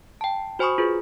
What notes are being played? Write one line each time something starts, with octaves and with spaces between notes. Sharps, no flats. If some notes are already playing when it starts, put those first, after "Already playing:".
G5 A5
F#4 C5 G#5 B5 C#6 D#6
F4 G#4 B4